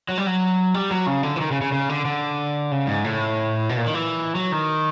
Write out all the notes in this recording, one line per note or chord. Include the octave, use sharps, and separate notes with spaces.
F#3
G3
F#3
G3
F#3
C#3
D3
E3
D#3
C#3
C#3
C#3
D3
D3
C#3
G#2
A2
B2
A#2
D#3
E3
F#3
D#3